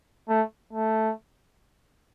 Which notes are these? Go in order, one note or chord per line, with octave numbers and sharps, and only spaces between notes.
A3
A3